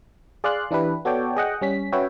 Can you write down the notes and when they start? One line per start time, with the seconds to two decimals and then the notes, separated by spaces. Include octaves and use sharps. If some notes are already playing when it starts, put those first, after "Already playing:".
0.44 G#4 D5 F5 C6 F#6
0.71 E3 D4 E4 G4 B4
1.05 B3 F#4 A4 C#5 D5 G5
1.36 G#4 D#5 F#5 G5
1.61 G3 C#4 B6
1.92 C#4 F#4 B4 C#5 E5 G5